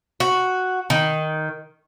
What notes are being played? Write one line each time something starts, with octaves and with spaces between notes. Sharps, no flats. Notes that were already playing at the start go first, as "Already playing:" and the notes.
F#4
D#3